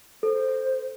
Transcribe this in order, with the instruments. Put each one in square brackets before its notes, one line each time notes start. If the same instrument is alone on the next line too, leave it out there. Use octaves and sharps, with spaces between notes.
[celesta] A4 [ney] C5